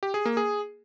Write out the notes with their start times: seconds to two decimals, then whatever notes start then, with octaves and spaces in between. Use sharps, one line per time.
0.03 G4
0.14 G#4
0.26 A#3
0.37 G#4